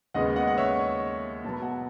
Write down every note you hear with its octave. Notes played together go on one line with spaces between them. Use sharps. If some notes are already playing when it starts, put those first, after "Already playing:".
D#2 C#3 G#3 B3 D#5 F#5
D#5 F#5
F#5
C#5 E5
C#5
B2 F#3 B3 A5
B5
F#5 A5